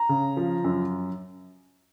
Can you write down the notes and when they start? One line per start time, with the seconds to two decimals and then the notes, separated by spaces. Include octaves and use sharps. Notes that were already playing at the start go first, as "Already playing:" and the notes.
Already playing: A#5
0.09 C#3
0.37 F3
0.64 F#2